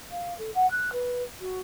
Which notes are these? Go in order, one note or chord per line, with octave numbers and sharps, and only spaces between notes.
F5
A4
F#5
F#6
B4
F#4